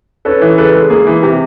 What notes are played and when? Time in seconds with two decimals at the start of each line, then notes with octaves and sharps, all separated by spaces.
0.25 C#4 A4 B4
0.41 E3
0.58 C#3 A4 B4
0.74 G#3
0.90 A#3 G#4
1.07 E3
1.23 C3